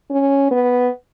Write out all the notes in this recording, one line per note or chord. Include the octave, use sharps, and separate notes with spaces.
C#4
B3